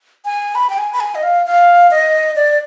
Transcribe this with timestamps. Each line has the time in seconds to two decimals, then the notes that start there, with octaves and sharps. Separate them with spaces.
0.25 G#5
0.55 B5
0.70 G5
0.78 G#5
0.93 B5
1.00 G#5
1.15 D#5
1.23 F5
1.46 F5
1.91 D#5
2.36 D5